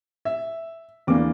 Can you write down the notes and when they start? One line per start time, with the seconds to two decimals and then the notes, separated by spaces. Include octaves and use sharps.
0.25 E5
1.07 E2 E3 A#3 D4 D6